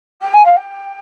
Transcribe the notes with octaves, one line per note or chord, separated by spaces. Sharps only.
G5
G#5
F5
G5